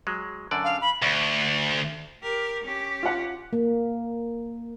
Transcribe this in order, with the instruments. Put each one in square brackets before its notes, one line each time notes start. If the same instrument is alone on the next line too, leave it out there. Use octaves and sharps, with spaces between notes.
[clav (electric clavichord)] F#3 G#3
F#2 D3 D5
[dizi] F5
B5
[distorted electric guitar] D2
[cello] G4 A#4
C#4 G4
[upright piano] F4 F#5
[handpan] A#3